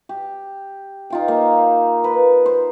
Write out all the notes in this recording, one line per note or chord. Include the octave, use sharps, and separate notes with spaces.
G4
D#4 F4 G5
A#3
B4
C5